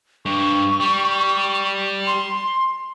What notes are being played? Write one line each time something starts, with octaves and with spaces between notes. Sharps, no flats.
G2 C#6
G3
C6